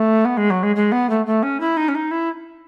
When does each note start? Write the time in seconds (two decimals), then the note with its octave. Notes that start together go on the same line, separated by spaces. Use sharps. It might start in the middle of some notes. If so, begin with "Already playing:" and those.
Already playing: A3
0.25 B3
0.37 G#3
0.50 F#3
0.63 G#3
0.75 G#3
0.91 B3
1.09 A3
1.26 A3
1.42 C#4
1.60 E4
1.76 D#4
1.88 C#4
1.94 D#4
2.11 E4